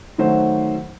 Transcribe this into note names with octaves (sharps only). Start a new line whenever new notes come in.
D#3 F#3 A3 C5